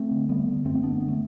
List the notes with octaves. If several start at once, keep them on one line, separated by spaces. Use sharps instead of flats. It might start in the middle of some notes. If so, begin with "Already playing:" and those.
Already playing: A3 C4
D3
D3 G3 B3
D3
F#2 A3 C4
D3 B3 D4
D3
A3